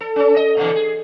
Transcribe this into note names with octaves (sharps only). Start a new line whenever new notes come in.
A4
C#4 A4
D#5
B2 D3 E3
G#4